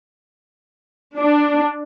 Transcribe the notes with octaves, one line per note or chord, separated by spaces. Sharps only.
D4